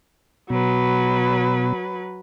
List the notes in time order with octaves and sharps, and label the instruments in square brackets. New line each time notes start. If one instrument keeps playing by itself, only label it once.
[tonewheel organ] B2 [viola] F#3 B4